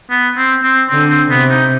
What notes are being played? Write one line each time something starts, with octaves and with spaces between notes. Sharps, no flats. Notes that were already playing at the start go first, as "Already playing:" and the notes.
B3
C4
C4
D3 C4
C4
C3 B3
D#4